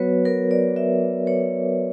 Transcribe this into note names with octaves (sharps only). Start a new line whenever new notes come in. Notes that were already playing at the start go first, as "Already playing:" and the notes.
Already playing: F#3 B3 F#4 B4 C#5
A#4
D5
E5
C#5